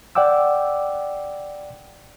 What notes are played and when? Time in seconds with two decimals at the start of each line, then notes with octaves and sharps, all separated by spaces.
0.15 D5 F#5 G5 D6 E6